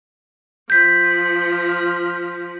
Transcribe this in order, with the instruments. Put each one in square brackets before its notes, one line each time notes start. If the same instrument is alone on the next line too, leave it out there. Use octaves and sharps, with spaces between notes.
[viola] F3 [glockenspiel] G6 B6